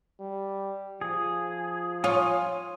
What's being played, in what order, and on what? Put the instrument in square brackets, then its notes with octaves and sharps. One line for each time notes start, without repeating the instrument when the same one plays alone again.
[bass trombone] G3
[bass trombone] F3 [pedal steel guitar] G#4
[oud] F4 C#5 [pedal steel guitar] G#5 D#6